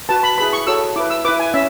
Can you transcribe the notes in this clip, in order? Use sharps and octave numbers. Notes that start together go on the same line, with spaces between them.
F#4 B4 A5
B5
E4 G#4 B4 B5
C#6
F#4 A4 C#5 E6
E4 B4 D6
E6
E4 B4 D6
G#5
C#4 E5